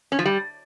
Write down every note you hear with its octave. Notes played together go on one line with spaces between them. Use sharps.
C#4
F3
G3